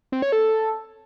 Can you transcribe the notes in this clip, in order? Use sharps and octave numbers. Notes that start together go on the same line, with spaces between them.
C4
C#5
A4